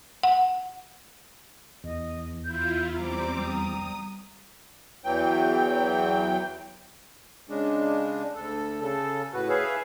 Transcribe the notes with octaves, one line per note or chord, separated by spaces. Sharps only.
F#5
E2 D#5
E4 F4 G6
G3 C4 A#5 D6
G3 D#6
E2 E3 F#3 G5
C#3 G#3 D4
D2 A4
C#3 A4
A2 F#4 B4
G#4 B4 C#5 E5 F5